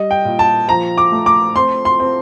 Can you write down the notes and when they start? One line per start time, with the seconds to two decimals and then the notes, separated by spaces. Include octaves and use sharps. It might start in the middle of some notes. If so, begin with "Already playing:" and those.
Already playing: G3 D#5
0.11 G5
0.25 A#2
0.39 A5
0.68 F3 A#5
0.98 D6
1.12 A3
1.26 D6
1.56 C4 C6
1.85 C6
2.00 C4